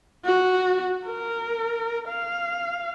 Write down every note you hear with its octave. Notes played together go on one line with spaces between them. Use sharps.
F#4
A#4
F5